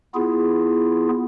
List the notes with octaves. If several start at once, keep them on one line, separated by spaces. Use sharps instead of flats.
B3 E4 F4 G#4